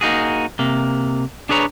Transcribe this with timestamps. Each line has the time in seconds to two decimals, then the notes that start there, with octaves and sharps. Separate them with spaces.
0.01 A#3 D#4 F#4 G#4
0.59 C3 A#3
1.49 D4 G#4 B4 C#5 A#5